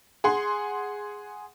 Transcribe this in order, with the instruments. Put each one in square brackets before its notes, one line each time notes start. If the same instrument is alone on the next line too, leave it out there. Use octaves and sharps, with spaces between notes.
[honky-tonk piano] G#4 F#5 C6